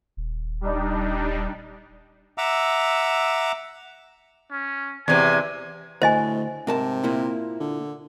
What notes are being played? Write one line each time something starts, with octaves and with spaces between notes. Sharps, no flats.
D#1
G3 D4 D#4
E5 F#5 A#5 D6 E6
C#4
E2 C3 G#5
D2 A2 C5 D#5 G#5
G#2 C3 A#4 A5
A#2 A#3 E4
D3